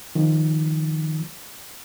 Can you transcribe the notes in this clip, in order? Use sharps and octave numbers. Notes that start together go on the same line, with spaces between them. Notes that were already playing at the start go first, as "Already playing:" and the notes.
D#3 F3